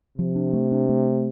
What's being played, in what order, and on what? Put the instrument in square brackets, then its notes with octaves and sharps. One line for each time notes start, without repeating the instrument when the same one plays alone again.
[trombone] C3 [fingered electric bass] F3
[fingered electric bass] D4
A3
D4
A3